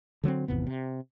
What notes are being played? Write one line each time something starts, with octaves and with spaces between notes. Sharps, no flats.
D3 F#3 A3 C4
G#1 E2 C3 B3
C3